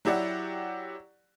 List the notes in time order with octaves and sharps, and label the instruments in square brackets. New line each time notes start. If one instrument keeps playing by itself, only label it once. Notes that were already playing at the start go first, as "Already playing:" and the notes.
[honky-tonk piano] F#3 E4 G4 D5 F#5